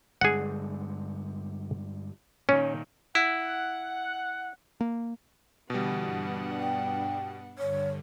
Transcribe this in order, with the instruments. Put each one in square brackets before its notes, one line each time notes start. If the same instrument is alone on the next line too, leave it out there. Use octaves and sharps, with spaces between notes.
[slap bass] G2 D3 G#3 [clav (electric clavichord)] G#4 F#5
[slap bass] A#2 D#3 [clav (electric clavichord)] C#4
[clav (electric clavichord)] E4 [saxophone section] F#5
[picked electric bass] A#3
[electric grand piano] B2 G3 [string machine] D3 E3 [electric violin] B3 F#5
[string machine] G2 D4
[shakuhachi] G5
[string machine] G2 D3 [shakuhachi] C#5